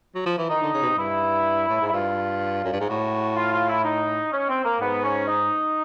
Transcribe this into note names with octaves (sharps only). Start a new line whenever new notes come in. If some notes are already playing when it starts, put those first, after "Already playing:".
F#3
F3
E3
D#3 D#4
D3
C#3
B2
C3
G2 E4
A2
G#2
E4
G2 F4
F#2
G2
G#2
A2 F#4
F4
F4
E4
D#4
C#4
C4
A#3
G#2 B3
C#4
D#4